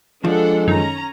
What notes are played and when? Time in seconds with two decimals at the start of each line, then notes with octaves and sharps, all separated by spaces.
0.24 F3 G#3 D4 A4 F#5
0.68 F#2 D#3 C#4 A#5